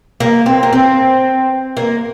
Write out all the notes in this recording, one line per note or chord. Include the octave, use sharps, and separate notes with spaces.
A#3
C4
A#3
C4
A#3